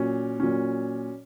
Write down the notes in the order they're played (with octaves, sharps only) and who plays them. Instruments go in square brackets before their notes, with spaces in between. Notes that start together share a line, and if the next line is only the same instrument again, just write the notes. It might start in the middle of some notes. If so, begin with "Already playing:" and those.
Already playing: [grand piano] A#2 F#3 C#4
A#2 F#3 C#4